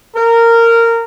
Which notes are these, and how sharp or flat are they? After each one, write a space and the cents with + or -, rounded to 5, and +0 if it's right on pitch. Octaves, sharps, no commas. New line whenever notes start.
A#4 -15